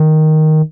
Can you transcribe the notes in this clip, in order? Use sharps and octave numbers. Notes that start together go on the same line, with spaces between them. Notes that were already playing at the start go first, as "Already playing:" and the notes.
Already playing: D#3